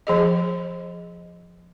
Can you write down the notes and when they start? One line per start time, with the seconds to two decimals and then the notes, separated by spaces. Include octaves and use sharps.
0.07 F3 G#4 D#5